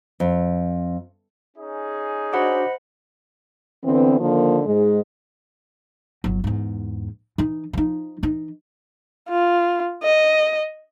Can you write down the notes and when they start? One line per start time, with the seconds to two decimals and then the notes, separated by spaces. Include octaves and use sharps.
0.20 F2
1.56 C#4 D#4 G#4
2.33 D4 F#4 C5 D#5 F#5 B5 D6
3.84 D3 E3 B3 C4
4.20 D3 D#3 F3 A#3
4.65 G#2 G#3
6.24 G1 F#3
6.44 E2 G#2
7.38 E3 D#4
7.73 F3 D#4
8.23 E3 D#4
9.29 F4
10.03 D#5